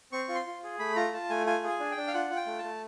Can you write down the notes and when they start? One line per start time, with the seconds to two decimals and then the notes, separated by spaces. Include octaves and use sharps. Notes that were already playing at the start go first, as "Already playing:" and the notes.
0.12 C4 C#6
0.29 F4
0.35 C6
0.47 F4
0.63 G#4
0.79 A3 B5
0.96 F4 A#5
1.13 F4 A5
1.29 A3 G#5
1.46 F4 G#5
1.64 G#4 G#5
1.80 D4
1.91 G5
1.97 D4
2.07 F5
2.14 F4 F#5
2.31 F4
2.36 G5
2.46 A3
2.58 A3 A5